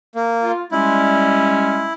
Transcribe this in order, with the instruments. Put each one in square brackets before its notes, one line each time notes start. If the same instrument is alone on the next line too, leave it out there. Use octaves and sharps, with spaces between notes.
[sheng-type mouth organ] A#3
[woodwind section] F4
[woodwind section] G3 G#3 C#4 [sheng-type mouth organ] E4